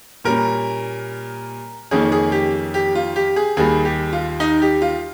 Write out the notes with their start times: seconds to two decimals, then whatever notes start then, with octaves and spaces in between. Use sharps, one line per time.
0.24 A#2 G3 C#4 A#4
1.91 F2 D#3 A#3 C#4 G#4
2.12 G#4
2.32 G4
2.74 G4
2.95 F4
3.16 G4
3.36 G#4
3.57 D#2 D#3 G3 G#4
3.85 G4
4.13 F4
4.40 D#4
4.62 G4
4.82 F4